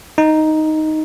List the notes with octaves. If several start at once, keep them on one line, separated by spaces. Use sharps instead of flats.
D#4